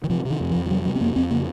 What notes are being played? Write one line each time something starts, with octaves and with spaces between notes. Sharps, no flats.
D#3
C3 F3
C3
D#3
F2
F3
F2
F3
C3 F#3
C3 F#3
C4
F2 A#3
F2 C4
C#3 A#3